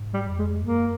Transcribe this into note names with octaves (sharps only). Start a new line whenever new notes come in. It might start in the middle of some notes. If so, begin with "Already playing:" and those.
Already playing: G#2
G3
F2
G#3
F#2 A#3